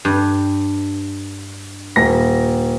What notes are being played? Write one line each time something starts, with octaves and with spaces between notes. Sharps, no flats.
G2
D#1 A#6